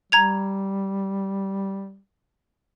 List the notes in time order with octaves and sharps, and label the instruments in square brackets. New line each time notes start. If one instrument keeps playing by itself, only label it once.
[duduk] G3 [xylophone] A#5 G#6 F7